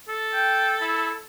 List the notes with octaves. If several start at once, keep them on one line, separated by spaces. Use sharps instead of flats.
A4
G5
E4